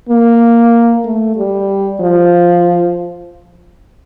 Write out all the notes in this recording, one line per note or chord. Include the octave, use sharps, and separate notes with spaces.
A#3
A3
G3
F3